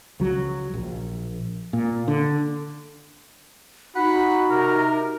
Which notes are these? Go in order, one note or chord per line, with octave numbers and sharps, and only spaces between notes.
C#2 F#3
A#1
A#2
D3
D#4 F#4 F#5 B5
C3 A#4